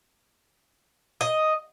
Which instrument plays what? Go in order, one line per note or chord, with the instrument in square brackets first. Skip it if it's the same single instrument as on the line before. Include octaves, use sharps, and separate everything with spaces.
[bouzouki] D#5